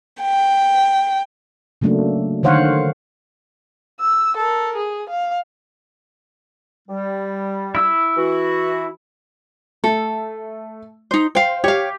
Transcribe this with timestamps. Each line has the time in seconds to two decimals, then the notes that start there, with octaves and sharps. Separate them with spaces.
0.21 G5
1.82 C#3 F#3 A3 A#3 D4
2.43 D3 D#3 C5 C#5 F5 F#5
4.01 E6
4.37 A4 A#4
4.76 G#4
5.09 F5
6.88 G3
7.75 E4 E6
8.17 E3 F#4
9.84 A3 A4
11.11 D#4 C5
11.35 C5 F5 G5
11.64 G4 C#5 F5